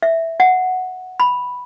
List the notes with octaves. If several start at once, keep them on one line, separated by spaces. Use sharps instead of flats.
E5
F#5
B5